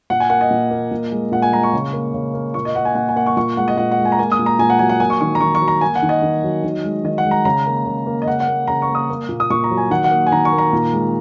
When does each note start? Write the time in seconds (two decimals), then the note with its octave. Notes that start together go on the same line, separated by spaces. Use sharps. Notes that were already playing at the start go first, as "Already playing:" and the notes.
0.10 A#2 F#5
0.20 G#5
0.29 A#3 F#5
0.41 D#5
0.51 A#2
0.71 A#3
0.91 A#2
1.12 G#3
1.32 A#2 F#5
1.42 G#5
1.52 G#3 A#5
1.63 C#6
1.73 C#3
1.93 A#3
2.14 C#3
2.34 A#3
2.54 A#2 C#6
2.65 D#5
2.75 A#3 F#5
2.85 G#5
2.95 A#2 F#5
3.09 G#5
3.16 A#3 F#5
3.26 C#6
3.37 A#2 C#6
3.57 G#3 F#5
3.68 D#5
3.77 A#2 F#5
3.92 F#5
3.98 G#3
4.05 G#5
4.12 A#5
4.19 A#3 G#5
4.32 D#6
4.39 A#2
4.46 A#5
4.59 A#2 G#5
4.70 F#5
4.79 F#3 G#5
4.89 F#5
5.00 A#3 G#5
5.10 C#6
5.21 D#3 C#6
5.35 A#5
5.40 D#3 C#6
5.55 C#6
5.61 F#3
5.68 A#5
5.81 A#3 G#5
5.95 F#5
6.02 D#3
6.09 D#5
6.22 D#3
6.43 F#3
6.64 D#3
6.85 G#3
7.04 D#3 D#5
7.18 F#5
7.25 G#3
7.31 A#5
7.45 C#3 A#5
7.66 A#3
7.86 C#3
8.07 A#3
8.22 D#5
8.27 C#3 F#5
8.40 F#5
8.47 A#3
8.67 C#3 A#5
8.82 C#6
8.89 A#3
8.95 D#6
9.10 A#3
9.29 A#2
9.40 D#6
9.50 A#2 C#6
9.64 A#5
9.71 F#3
9.77 G#5
9.90 D#3 F#5
10.04 F#5
10.11 A#3
10.27 G#5
10.32 D#3 A#5
10.45 C#6
10.52 A#3
10.58 A#5
10.73 A#2
10.93 G#3